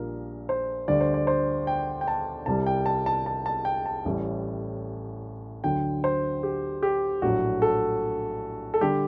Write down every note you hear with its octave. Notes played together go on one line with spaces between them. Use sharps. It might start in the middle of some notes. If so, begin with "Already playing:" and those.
Already playing: A#1 A#2 G3 A#4
C5
D2 D3 G3 D5
C5
D5
C5
G5
G5
A5
C2 C3 G3 A5
G5
A5
A5
A5
A5
G5
A5
A1 A2 G3
D2 D3 F#3 G5
C5
G4
G4
A#1 A2 F#3 F#4
A4
A4
D3 G3 G4